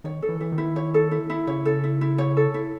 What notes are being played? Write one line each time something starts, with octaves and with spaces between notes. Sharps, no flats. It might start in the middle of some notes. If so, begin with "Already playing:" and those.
D#3 C#5
A4
E3
E3 E4
D#3
E4
C#5
A4
E4
E4
C#3 C#5
A4
E4
E4
C#5
A4
E4